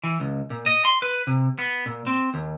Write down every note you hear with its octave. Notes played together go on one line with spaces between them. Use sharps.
E3
C#2
A#2
D#5
C6
B4
C3
B3
A#2
C4
D#2